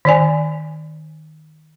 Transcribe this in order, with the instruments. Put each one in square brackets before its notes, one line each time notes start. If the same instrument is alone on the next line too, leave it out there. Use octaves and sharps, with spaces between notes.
[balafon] D#3 D5 G#5